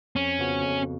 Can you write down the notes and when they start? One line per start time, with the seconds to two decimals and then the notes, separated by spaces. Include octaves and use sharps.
0.15 F2 C#4
0.39 C#3 F3 B3 F#4
0.62 F2